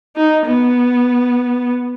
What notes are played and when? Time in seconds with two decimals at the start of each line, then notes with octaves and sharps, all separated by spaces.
0.16 D#4
0.46 B3